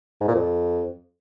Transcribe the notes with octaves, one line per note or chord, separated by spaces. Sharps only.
G#2
A#2
F2